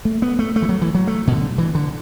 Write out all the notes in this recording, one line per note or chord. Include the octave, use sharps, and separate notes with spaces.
A3
B3
A3
A3
E3
F#3
E3
F#3
A3
B2
D3
E3
D3